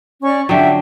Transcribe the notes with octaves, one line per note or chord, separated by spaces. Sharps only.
C#4 D5 C#6
D3 F#3 G4 E5 G5